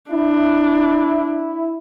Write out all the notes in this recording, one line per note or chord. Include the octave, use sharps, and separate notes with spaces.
D4 E4